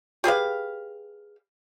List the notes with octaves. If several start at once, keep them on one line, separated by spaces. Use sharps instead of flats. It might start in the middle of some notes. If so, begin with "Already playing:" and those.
G4 G#4 B4 F5